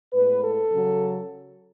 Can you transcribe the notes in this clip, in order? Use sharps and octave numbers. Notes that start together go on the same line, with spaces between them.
A2 G#3 B3 B4
A4
C#3 F#3